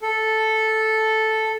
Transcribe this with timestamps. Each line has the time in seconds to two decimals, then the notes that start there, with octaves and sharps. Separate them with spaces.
0.02 A4